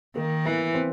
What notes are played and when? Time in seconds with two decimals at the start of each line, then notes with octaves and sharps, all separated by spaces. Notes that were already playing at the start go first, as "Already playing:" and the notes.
0.16 D#3 A#3
0.45 E3 B3
0.74 C4